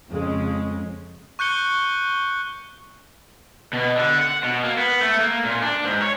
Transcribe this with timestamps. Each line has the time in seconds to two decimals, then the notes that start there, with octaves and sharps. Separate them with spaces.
0.11 F2 C#3 G#3
1.39 C#6 F#6 G6 C#7 G7
3.73 B2
3.96 D3
4.19 F#5
4.44 B2
4.64 A#3
4.78 B3
5.01 A3
5.20 A#3
5.45 A#2
5.62 D4
5.84 G#2
6.02 C#5